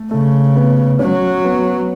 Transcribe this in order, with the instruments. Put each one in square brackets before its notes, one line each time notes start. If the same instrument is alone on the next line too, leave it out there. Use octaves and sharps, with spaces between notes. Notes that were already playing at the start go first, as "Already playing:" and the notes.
Already playing: [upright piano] A3
[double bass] C#3 [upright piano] A3
[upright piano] B3
[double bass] F#3 [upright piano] C#4
[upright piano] B3